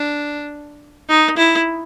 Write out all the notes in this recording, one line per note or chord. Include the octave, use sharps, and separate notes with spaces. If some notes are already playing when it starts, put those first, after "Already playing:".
Already playing: D4
D#4
E4